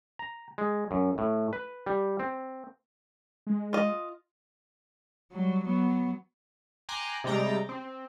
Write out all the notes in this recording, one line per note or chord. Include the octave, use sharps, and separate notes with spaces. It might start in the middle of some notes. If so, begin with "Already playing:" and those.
A#5
G#3
F#2
A2
B4
G3
C4
G#3
F4 D#5
F#3 G3
F#3 B3
G5 G#5 A#5 C6 D6 F#6
C3 G3 G#3 G5 A#5 A6
C4